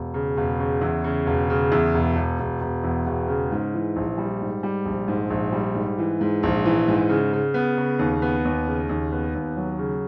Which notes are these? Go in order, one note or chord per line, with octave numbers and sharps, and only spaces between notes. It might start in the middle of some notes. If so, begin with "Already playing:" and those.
Already playing: E1
C#3
E1
C#3
E2
C#3
E1
C#3
E2
E1
E1
E1
E1
E2
E1
C#3
G#2
E3
A#1
G3
G#2
G3
A#1
G#2
A#1
G3
G#2
E3
G#2
A#1
E3
G#2
C#3
C#3
B3
C#3
D#2
B3
D#2
C#3
D#2
B3
D#2
F#3
C#3